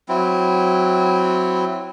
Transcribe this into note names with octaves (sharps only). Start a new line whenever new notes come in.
F#3 C4 E4